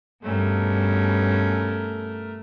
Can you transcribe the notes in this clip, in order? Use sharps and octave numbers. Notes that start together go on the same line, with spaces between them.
G2 B2 A3 C#4 A#4